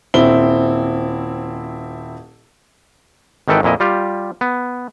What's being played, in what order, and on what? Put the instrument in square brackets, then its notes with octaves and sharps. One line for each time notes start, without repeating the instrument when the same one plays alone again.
[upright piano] D#1 C4 E4 G7
[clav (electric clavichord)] G#1 D#3 E3 A4 B4 G5
F2 A#2 E4 D#5
G3 F4 G4
B3